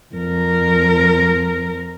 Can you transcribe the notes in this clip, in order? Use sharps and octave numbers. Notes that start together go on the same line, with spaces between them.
F2 A#4